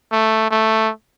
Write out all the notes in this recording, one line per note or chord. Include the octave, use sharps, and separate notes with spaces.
A3
A3